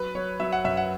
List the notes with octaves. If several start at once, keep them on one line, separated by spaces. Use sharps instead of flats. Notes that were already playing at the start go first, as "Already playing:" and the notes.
Already playing: F#3 B4
F#3 C#5
F#3 E5
F#5
F#2 E5
F#5